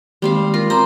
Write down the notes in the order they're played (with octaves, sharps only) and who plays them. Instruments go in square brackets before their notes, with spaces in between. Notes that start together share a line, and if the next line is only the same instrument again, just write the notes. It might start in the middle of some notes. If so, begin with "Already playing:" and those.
[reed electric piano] D#3 G#3 A#3 [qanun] G3 C4 F5
[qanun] F4 [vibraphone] A#4
[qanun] C4 [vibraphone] A#5 C6 D6